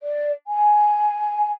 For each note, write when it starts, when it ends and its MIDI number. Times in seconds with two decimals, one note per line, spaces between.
0.03 0.31 74
0.48 1.51 80